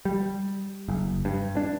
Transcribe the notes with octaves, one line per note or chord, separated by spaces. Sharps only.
G3
F#1
G2
D4